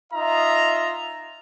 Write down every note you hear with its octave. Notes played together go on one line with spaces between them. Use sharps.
D#4 F4 D#5 E5 A#5